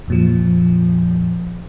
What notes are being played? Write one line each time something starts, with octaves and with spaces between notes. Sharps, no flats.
F2 A#2 F3